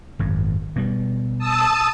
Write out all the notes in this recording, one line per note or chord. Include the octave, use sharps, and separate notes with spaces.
G#1 F#2
B2 G3
A5 D#6 E6